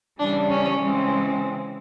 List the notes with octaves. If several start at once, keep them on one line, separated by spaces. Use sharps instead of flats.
C#3 E3 G3 D4
C#4
C#3 E3 G#3 C4